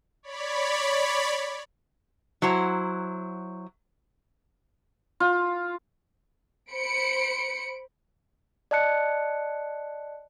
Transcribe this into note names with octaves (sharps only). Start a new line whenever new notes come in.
C#5 D5 B5
F#3 E4 C5 A#5
F4
C5 B5 C#7 D7
D5 D#5 A5 F#6 C#7